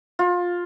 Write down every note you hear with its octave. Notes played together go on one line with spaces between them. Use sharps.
F4